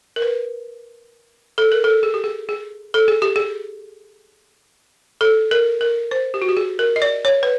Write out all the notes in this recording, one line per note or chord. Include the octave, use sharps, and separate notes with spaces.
A#4
B4
A4
A#4
A4
G#4
G4
G#4
G#4
A4
G#4
G4
G#4
A4
A#4
A#4
C5
G4
F#4
G4
G#4
A#4
D#5
D5
C#5
B4